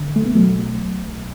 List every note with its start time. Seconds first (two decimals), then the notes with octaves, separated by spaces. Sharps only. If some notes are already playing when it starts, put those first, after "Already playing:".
Already playing: D3
0.16 B1 A3
0.26 B3
0.35 B2 F#3 A3
0.61 B1
0.84 B1
1.06 B1